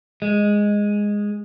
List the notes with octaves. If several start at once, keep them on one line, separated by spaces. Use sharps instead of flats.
G#3